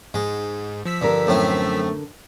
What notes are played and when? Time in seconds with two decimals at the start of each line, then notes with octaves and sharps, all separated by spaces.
0.14 G#2 G#3
0.86 F3 E6 B6
1.01 G2 D3 A#4
1.27 F#2 A2 A3 C4